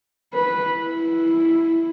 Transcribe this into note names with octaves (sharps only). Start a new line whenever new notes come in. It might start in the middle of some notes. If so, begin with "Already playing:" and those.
B4
E4